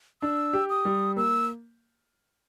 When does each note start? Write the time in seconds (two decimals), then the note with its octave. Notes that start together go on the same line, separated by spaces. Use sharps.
0.22 D4 E6
0.53 G4
0.69 D#6
0.85 G3
1.16 A#3 E6